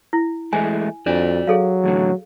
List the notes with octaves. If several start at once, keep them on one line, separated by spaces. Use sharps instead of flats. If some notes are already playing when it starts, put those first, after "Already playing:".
E4
E3 G#3 A3 G#5
F2 D4 F#4 D5
F#3 G#4 A4 F5
E2 A2 D3